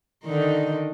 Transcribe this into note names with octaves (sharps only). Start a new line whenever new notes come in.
D3 D#3 D#4